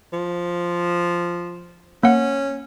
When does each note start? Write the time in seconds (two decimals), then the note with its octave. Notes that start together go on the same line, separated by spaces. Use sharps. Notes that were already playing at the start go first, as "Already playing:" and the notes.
0.13 F3
2.03 A#3 C#4 F#5